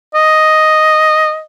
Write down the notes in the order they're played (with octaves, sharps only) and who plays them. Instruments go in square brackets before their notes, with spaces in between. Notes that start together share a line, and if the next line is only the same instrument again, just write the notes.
[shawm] D#5